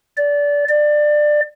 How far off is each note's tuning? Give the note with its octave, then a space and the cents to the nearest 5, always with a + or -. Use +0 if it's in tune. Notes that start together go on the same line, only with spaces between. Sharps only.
D5 -20
D5 +20